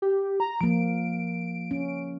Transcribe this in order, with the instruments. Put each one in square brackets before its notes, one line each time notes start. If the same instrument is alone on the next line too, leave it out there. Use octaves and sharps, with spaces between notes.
[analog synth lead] G4
A#5
[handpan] F3 A#3 [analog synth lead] D7
[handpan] C#4